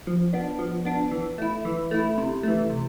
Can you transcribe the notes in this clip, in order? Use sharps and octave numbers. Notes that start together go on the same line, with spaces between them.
F3
B3 D4
F3
B3 D4
E3
A3 E4
E3
A3 E4
C3
E3 A3
C3